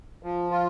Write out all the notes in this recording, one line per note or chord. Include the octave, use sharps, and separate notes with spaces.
F3
F4